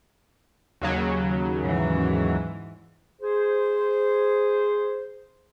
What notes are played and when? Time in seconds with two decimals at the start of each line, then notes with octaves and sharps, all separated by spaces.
0.81 D#2 C#3 F#3
1.62 G#2 E3
3.22 G#4 C5